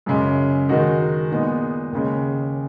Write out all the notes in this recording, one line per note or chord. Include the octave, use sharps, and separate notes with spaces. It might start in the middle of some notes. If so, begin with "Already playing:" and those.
F#2 C#3 G#3
D#3 G#3 D#4 F#4
A#2 G#3 B3 D#4
D#2 C#3 G#3